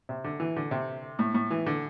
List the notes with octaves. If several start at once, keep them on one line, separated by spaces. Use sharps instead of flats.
C3
D3
E3
D3
C3
A2
A2
E3
D3